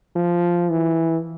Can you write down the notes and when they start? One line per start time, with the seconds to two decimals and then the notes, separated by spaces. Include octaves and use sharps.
0.16 F3
0.70 E3